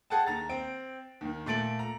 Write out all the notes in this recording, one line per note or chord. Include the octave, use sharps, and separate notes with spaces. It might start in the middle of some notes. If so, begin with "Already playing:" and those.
G#4 A4 F#5 G5 A5
D#2 A#5 A6
C4 G5 D7
D#2 D#3
A#2 A3 A6 D7 F#7
A#5